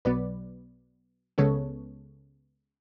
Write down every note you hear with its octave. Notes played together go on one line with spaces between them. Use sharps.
B1 B2 F#3 B3 B4 D5
C#2 C#3 G#3 B3 A4 C#5